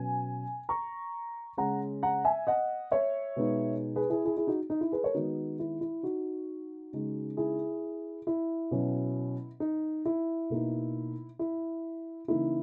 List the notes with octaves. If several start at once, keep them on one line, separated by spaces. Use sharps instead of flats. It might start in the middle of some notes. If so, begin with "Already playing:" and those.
Already playing: B2 F#3 C#4 G#5
A#5 C#6
C#3 G#3 C#4 F#5 A#5
F#5 A#5
E5 G#5
D#5 F#5
C#5 E5
B2 G#3 B3 D#4
G#4 B4
E4 G#4
E4 G#4
E4 G#4
D#4 F#4
D#4
E4
G#4 B4
A#4 C#5
D#3 G#3 B3 D#4 F#4
E4
E4
D#4 F#4
C#3 G#3 D#4
E4 G#4
E4
B2 F#3 C#4
D#4
E4
B2 A#3 D#4
E4
C#3 E3 A#3 D#4 E4